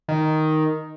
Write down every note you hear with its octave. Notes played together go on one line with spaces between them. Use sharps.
D#3